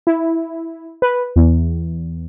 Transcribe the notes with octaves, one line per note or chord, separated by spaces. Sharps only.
E4
B4
E2